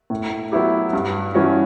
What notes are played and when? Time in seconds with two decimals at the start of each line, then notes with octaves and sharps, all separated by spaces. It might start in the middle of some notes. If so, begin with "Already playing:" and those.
0.10 A2
0.52 F#3 B3 E4 G4
0.93 G2
1.34 E3 G3 C#4 F#4